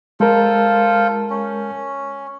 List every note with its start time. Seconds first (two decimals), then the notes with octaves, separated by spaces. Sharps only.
0.20 G#3 F4 A4 A#4 C5
1.30 C#4